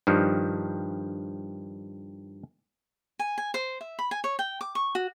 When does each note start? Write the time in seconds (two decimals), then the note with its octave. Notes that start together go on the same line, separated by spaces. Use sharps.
0.07 G2 D#3 F3 G3
3.19 G#5
3.38 G#5
3.54 C5
3.81 E5
3.99 B5
4.11 G#5
4.24 C#5
4.39 G5
4.61 D6
4.75 C#6
4.95 F#4